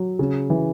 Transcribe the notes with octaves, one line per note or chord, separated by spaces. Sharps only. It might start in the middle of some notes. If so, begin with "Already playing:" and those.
Already playing: F#3
C#3
E3